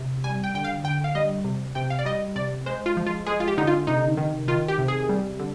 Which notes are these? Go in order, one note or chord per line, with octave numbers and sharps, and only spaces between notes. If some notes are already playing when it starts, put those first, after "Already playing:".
Already playing: C3
G3 G#5
G5
D3 G5
F5
D3 G5
F5
G3 D#5
C3
C3 G5
F5
D5
G3 D#5
C3 D5
G#3 C5
F4
F3
F4
G#3 G#4
F4
G4
D3 D#4
F4
C3 D#4
D#3
D#3 F4
G4
C3
G#4
G3
D3